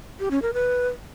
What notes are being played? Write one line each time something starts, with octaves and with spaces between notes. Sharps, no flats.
G4
C#4
A#4
B4